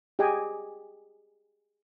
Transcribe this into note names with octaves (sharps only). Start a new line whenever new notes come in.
G4 G#4 D#5 G5 G#5